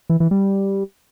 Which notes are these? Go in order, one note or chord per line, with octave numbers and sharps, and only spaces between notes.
E3
E3
G3